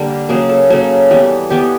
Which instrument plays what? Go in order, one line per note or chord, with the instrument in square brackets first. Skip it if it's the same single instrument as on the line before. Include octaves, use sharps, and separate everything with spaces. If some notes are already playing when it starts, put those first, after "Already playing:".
Already playing: [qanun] D3 G3 A#3 A4
C#3 F#3 A#3 G#4
A4
C#3 F#3 A#3 A4
E3 G3 B3
E3 G3 B3 G4